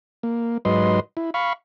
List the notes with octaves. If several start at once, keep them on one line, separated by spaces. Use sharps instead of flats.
A#3
G#2 F#3 B4 D#5 C6
E4
F5 B5 C#6